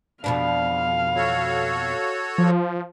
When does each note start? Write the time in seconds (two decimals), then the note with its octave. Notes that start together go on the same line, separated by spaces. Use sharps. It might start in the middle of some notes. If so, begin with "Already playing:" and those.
0.24 F2 B2 D4 F5
1.15 F#4 A4 C#5
2.38 F3